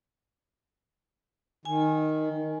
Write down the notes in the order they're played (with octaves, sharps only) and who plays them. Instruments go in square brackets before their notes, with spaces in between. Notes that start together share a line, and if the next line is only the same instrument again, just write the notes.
[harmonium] D#3 [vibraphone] G#5